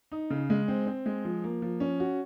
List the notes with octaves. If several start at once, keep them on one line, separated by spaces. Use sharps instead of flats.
D#4
C#3
G#3
C4
C4
G#3
F3
A#3
F3
C#4
F#4